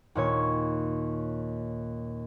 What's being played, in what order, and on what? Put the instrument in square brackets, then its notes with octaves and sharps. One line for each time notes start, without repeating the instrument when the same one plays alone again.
[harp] D#2 A#2 C#5